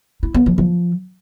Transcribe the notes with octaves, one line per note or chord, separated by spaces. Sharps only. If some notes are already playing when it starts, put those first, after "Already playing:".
E4
B3
F3
F3